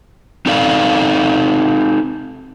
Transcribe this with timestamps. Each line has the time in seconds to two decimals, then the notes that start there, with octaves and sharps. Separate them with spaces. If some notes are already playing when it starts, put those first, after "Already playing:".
0.46 C4 D#4 A4 D5 F5